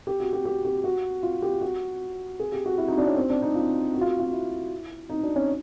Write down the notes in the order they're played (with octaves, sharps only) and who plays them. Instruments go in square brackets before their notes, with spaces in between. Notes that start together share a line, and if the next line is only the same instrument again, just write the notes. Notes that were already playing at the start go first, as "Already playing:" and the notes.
[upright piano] G4
F#4
G4
G4
G4
F#4
F4
G4
F#4
G#4
G4
F#4
E4
D#4
D4
C#4
C4
D4
D#4
F4
F#4
F4
F#4
F4
E4
D#4
D4
C#4